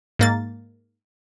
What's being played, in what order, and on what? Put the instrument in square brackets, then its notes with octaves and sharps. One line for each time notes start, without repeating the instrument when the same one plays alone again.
[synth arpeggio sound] G#2 A#3 A6